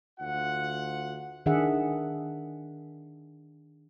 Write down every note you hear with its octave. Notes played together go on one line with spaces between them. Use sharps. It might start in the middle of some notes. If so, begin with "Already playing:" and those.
D2 F4 F#5
D#3 D4 G#4 E5 F#5